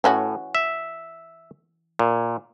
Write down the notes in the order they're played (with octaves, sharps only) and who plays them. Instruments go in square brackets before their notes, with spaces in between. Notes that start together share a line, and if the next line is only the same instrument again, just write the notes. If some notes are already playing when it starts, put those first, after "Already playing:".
[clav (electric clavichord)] A2 [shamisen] E3 C#4 F#4
[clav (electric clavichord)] E5
A#2